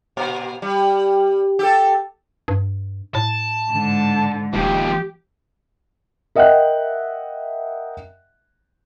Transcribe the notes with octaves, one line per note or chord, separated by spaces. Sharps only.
A#2
G3
G4 A4
G2
A2 A5
G#2 D3
D#1 D#2 F3 G4
A#4 D#5 E5 F#5 G5 F#6